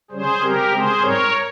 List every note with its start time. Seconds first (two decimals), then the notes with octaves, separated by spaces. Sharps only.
0.11 C#3 G3 C#4 G#4 C5
0.41 C#3 G3 C4 G4 A#4
0.71 C#3 G#3 C4 G#4 C5
1.01 G#2 G3 C4 A#4 C#5